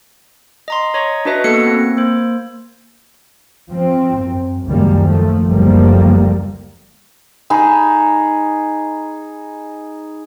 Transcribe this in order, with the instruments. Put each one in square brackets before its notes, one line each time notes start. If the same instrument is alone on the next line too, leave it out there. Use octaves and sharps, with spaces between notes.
[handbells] D#5 A#5 C6
C#5 D#5 A#5 C#6
D4 F#4 B4 D#5 E5
A#3 B3 F#4 A4 C#7
A#3 C4
A#3 C5
[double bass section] F3 C4
F#2
C#2 F#2 D#3 G3 A#3
D#2 F3 A3
F#1 D2 D3 F3 G3 A#3
[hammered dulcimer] D#4 G#4 B5